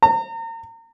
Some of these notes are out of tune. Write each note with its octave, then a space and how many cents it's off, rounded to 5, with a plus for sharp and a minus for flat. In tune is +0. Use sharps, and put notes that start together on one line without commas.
A#5 -35